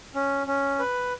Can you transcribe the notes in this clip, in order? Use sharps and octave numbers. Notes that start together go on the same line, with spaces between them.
C#4
C#4
B4